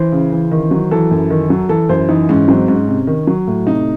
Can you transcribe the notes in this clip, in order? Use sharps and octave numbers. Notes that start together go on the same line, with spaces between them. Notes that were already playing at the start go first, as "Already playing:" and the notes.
Already playing: E3 C5
C#3
E3
D#3
F#3
E3 A4
F#2
D#3
F#3
E3 A4
F#2 C5
E3 D#4
G#2 C#4
F#3 C4
G#2 C#4
C3
D#3
F#3
A2
C3 D#4